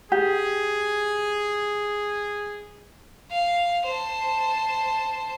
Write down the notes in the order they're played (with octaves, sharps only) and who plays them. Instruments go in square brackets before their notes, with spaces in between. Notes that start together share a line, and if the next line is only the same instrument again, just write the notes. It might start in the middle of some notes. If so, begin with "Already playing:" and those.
[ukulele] G4 [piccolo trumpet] G#4
[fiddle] F5
C5 A5